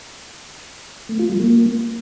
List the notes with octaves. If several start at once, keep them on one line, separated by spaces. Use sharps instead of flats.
A3
F4
G3
A#3